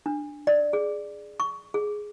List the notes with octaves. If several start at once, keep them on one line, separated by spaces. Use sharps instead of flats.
D4
D5
G#4
C#6
G#4